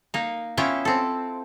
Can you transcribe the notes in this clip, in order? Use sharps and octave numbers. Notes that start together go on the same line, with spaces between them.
A#3 D#4
B3 C#4 E4 F4 E5 G5
C4 A4